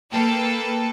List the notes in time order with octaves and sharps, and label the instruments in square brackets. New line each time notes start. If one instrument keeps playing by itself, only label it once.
[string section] A#3 A4 B4 G5 A5